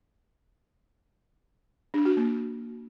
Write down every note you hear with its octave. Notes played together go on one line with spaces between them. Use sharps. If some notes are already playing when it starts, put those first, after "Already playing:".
D4
F#4
A#3